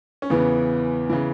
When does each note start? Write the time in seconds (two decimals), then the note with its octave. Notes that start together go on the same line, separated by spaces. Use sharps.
0.22 C#4
0.30 E2 C#3 E3 B3
1.09 C#3 E3